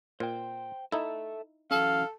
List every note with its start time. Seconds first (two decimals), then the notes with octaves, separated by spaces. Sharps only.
0.20 A#2 C5 G5
0.92 D#4 E4 A4 E5
1.71 E3 F#3 C#4 A4 F5